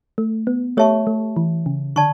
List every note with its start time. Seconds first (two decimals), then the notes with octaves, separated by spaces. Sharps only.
0.18 A3
0.47 B3
0.77 A3 G4 C#5 E5 A5 C#6
1.07 A3
1.36 E3
1.66 C#3
1.96 D3 D5 A5 C#6